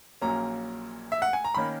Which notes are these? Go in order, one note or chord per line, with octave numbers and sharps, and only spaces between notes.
A#1 A#2 F#3 A#3 C#4 A#5
E5
F#5
G#5
A#5
D#3 A#3 C#4 B5